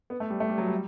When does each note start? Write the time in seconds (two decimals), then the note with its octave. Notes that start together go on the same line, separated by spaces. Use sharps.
0.10 B3
0.20 A3
0.30 G3
0.40 A3
0.49 G3
0.58 F#3
0.68 G3